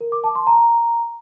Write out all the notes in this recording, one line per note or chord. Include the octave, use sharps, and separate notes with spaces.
A#4
D6
A5
C6
A#5